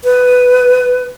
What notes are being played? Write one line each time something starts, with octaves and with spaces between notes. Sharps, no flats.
B4